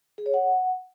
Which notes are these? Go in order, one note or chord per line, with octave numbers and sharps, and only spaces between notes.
G#4
C#5
F#5